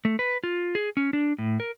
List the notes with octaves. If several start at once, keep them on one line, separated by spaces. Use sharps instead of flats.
A3
B4
F4
G#4
C#4
D4
A2
A#4